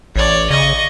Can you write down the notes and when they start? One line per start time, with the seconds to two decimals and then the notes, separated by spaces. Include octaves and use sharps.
0.16 A1 C#5 D5
0.50 C#3 D#5 C#6